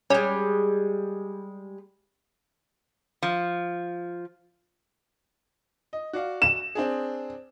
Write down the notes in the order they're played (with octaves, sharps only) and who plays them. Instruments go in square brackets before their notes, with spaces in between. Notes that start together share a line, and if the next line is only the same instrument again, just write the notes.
[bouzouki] G3 G#3 [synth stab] C#4
[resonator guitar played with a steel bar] F3
[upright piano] D#5
F#4 D5 F5
[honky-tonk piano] E7
[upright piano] C4 D4 G#4